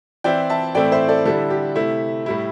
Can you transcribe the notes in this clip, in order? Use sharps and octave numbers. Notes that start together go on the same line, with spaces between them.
E3 C4 E4 D5 G5
E5 A5
A2 E3 A3 C4 E4 D5 G5
C5 E5
A4 D5
D3 G3 D4 E4 A4
G4
C3 A3 E4
A2 G3 E4